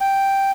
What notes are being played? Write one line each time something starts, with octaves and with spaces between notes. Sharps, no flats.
G5